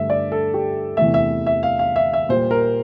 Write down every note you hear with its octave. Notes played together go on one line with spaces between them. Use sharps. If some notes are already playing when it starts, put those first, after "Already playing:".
Already playing: G2 D3 A3 E5
D5
A4
G4
E2 C3 E3 A3 E5
E5
E5
F5
F5
E5
E5
A#2 G3 C5
A#4